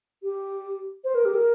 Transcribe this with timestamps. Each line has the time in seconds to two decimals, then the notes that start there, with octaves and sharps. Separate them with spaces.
0.23 G4
1.04 C5
1.15 A#4
1.25 G4
1.35 A#4